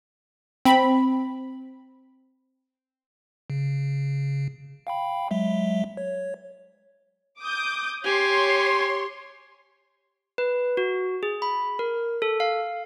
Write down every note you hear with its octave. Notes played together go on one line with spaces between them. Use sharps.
C4 B5
C#3
F5 G5 B5
F#3 G#3 E5
C#5
D6 D#6 G6
G4 C#5 G#5 C6
B4
F#4
G#4
B5
A#4
A4
F5